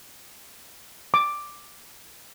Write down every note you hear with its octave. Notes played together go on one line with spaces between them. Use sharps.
D6